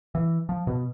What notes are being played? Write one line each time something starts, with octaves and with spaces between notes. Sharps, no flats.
E3
F3
B2